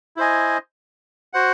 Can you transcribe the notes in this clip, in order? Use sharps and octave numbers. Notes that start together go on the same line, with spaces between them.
E4 C5 D#5 G#5
F#4 C5 F#5